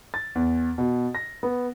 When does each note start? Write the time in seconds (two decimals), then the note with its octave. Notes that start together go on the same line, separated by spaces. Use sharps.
0.14 A6
0.35 E2
0.78 B2
1.15 A#6
1.43 B3